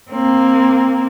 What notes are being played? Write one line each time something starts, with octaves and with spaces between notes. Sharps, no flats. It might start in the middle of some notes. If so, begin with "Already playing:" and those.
A#3 C4